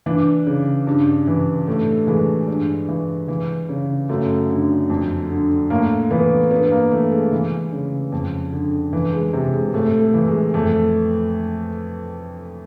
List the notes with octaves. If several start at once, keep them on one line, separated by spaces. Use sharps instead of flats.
E3 D4
C#3
G2
E3
A2 A3
E3 G#3
G2
E3
E3
C#3
F#2 A3
D3
F2
D3
A2 A#3
E3 B3
G2 B3
A#3
E3 A3
G#3
E3
C#3
F2
D3
E3
G#3
C3
G#3
A2 A3
A3
E3
G#3
F2 A3